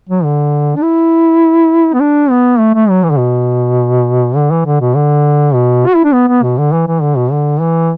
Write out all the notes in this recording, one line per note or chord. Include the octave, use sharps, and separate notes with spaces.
F#3
D3
D4
E4
B3
D4
B3
A3
A3
F#3
E3
D3
B2
D3
E3
D3
B2
D3
B2
F#4
E4
D4
B3
B3
B2
D3
E3
E3
D3
B2
D3
E3